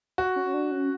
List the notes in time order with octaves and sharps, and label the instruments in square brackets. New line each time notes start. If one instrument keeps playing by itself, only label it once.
[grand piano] F#4
[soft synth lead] C#4
D4
C#4